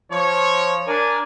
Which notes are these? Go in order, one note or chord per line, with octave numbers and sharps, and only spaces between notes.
F3 C#5
D4 A#4 D5 G#5 A5